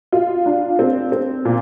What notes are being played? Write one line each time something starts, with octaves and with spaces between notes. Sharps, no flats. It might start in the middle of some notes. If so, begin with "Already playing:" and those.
F4
D4
C4
C4
A#2